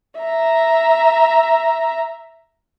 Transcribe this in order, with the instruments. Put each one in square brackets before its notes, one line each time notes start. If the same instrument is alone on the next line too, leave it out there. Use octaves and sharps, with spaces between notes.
[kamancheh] E5 A#5